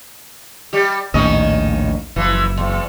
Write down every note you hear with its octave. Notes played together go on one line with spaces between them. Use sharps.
G3 G4
A#1 D#2 A2 D#3 C#4 D#5
F#1 E3 F3
E2